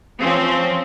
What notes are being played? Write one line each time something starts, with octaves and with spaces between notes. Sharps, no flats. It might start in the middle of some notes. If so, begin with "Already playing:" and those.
F3 C4 C#4